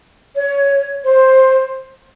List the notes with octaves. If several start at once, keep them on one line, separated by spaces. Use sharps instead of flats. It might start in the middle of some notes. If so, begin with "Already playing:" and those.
C#5
C5